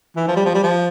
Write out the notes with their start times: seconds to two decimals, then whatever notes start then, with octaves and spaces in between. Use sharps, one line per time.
0.16 E3
0.28 F3
0.36 G3
0.45 F3
0.54 G3
0.63 F3